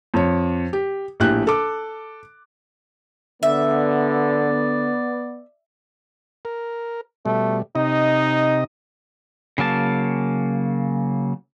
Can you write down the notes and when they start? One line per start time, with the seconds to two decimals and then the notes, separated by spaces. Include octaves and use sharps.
0.14 F2 C#5
0.73 G4
1.20 A#1 A2 G4 G5 F#6
1.47 A4 D6
3.43 D3 B3 D5 E5
6.45 A#4
7.25 B2 G3 A3
7.75 C3 D#4 D#5
9.58 C#3 F#3 A#3 A5